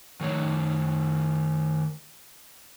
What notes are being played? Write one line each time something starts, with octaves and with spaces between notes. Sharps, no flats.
D#3 A3 C#5